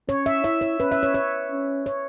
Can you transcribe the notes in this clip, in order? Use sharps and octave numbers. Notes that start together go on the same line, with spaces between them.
C#4 C#5
E5
E4 E5
C#5
C#4 B4
E5
C#5
C#5
C#4
C#5